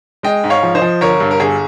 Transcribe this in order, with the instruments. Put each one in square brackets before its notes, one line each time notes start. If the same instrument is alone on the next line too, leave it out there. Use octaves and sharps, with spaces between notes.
[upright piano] G#3 D#5 G5
G#2
C#5 F5
F3
C5 D#5
F3
G1 A#4 C#5
G2
A#4
G1 G#4